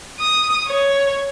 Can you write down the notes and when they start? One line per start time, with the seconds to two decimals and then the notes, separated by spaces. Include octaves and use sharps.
0.20 D#6
0.68 C#5